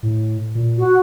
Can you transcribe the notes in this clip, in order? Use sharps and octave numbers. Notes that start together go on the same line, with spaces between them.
A2
A#2
F#4